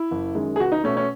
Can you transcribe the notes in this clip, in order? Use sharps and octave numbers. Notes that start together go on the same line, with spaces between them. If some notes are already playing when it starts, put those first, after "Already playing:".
Already playing: E4
F#1
F#2 D#3 G#3
G#4
C#2 F#4
D#4
B2 A3 C#4
C#4